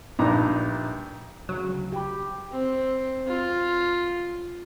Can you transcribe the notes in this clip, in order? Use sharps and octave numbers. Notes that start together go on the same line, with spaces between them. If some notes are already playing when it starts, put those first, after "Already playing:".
A#1 G2 D4 D#4 A#5 D6
D2 C#3 F#3
G4 G5 B5
C4
F4